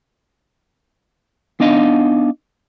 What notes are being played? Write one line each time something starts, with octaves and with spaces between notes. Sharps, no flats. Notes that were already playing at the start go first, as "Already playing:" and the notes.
B3 D4 D#4 D#5 F5